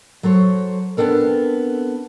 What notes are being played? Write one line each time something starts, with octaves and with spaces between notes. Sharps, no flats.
F#3 A4 C5 C#5
B3 C4 D4 A4 A#4